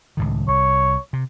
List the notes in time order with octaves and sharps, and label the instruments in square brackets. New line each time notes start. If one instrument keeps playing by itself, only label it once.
[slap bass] C#2 A2 D#3
[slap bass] C2 [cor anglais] C#5
[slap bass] C3